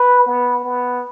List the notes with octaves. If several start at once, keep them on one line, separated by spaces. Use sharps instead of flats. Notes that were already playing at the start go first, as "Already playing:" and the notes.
Already playing: B4
B3
B3